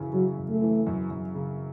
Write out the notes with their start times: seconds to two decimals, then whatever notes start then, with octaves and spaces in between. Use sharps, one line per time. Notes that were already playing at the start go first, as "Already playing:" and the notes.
Already playing: F#2 C#3 E3
0.13 C#3 F#3
0.37 F#2
0.50 A3
0.61 E3
0.87 F#2
1.11 F#2
1.35 C#3